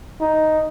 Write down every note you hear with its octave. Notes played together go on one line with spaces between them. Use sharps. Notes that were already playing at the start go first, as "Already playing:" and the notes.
D#4